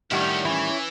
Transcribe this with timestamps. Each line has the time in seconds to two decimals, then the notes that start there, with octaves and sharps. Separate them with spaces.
0.11 A2 D#3 G3 C#4 D4 E4 F#5
0.45 E3 C#4 E4 C#5 G#5